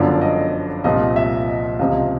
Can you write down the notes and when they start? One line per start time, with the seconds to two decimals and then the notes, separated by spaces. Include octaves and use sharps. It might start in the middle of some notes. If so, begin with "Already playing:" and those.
Already playing: G1 F#2 D3 F3 D5
0.21 D#5
0.84 C2 A#2 F3 D#5
1.16 E5
1.48 D#5
1.79 C#2 C3 F3 D#5